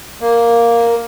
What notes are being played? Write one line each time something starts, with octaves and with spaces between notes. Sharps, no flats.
A#3